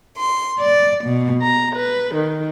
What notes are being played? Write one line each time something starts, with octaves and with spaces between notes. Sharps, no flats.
C6
D5
B2
A#5
B4
D#3